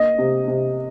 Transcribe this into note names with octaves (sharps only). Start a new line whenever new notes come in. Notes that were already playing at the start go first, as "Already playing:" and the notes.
Already playing: A#3 D#5
C3
C3